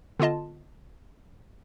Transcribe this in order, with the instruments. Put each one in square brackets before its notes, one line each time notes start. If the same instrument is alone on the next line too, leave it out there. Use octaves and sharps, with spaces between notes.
[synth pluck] D3 B3 F4 D#5 A5